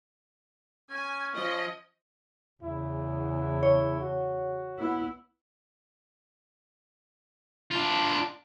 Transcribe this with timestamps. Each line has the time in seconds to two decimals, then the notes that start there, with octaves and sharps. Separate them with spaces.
0.91 C#4 G#5
1.34 F3 D#5
2.63 E2 C#3 E4
3.63 C#5
4.01 F#4
4.78 B3 E4
7.71 D4 F4